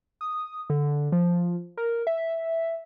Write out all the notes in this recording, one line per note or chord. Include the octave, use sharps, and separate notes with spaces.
D#6
D3
F3
A#4
E5